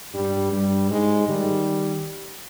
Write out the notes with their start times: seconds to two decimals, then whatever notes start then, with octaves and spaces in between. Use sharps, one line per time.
0.14 G2 G3
0.52 G2 G3
0.90 G#2 G#3
1.28 D#3 G3